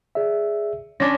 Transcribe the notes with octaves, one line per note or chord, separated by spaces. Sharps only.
G#4 D5 E5
C#4 D4 G#5 C6 A#6